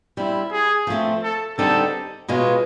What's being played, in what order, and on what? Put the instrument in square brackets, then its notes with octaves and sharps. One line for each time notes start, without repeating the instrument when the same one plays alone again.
[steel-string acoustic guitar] G3 C4 E4
[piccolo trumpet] G#4
[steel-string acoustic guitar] F3 A3 C4
[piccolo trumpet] A4
[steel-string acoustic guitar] D3 G3 C4 D#4 G#4 [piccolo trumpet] A4
[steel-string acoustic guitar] B2 G#3 C#4 F4 G#4